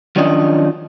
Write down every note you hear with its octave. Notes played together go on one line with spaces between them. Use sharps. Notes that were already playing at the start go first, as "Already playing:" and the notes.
D#3 F3 F#3 C#4 D4 D#5